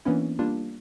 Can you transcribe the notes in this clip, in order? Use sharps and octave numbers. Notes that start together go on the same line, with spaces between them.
E3 A#3 B3 C#4 D4 E4
G3 A#3 D4 F4